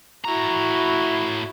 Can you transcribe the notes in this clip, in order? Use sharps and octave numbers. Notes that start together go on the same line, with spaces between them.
A2 E4 F#4 A#5